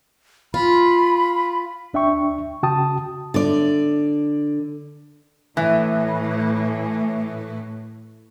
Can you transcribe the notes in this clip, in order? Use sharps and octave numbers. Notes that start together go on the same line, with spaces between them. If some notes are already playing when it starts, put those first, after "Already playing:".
F4 B5
D2 D4 E5 G5 C#6
C#3 F#4 G5 A5 D#6
D3 D5
A2 E3